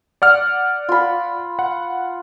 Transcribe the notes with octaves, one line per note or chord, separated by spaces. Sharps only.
D5 F#5 F6
F4 B5
F#5